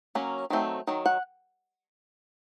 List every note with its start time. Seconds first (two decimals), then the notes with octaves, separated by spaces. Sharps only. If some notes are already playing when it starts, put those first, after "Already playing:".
0.15 F#3 A#3 C#4
0.50 D#3 F#3 A3 C4
0.87 D#3 F#3
1.06 F#5